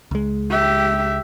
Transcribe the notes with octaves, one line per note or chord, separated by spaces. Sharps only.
C#2 G#3
G4 E5